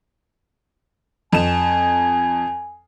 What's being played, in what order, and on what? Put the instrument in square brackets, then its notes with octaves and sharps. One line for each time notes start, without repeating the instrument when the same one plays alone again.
[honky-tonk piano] F2 E7 [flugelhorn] G#5